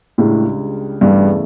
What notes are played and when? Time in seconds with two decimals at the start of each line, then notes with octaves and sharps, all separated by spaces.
0.18 C#2 A2 C#3 G3 D4
1.01 E2 G2 C#3 E3 A3